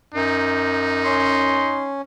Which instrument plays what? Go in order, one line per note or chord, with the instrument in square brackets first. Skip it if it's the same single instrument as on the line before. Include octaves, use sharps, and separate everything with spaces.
[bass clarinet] F#2 [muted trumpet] D#4
[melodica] C#4 [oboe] C6